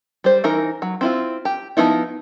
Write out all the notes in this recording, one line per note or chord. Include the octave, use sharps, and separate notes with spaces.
G3 C5
E3 D#4 A#4
F#3
C4 E4 F4
G4
F3 B3 D#4 E4